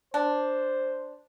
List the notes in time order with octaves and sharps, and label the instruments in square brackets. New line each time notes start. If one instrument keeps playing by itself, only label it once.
[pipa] D4 [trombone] C5